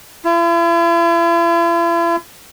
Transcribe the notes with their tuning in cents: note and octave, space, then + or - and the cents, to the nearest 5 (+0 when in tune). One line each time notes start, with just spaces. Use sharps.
E4 +45